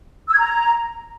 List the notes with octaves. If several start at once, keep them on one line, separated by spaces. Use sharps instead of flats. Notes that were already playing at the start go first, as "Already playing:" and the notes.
E6
G#6
A#5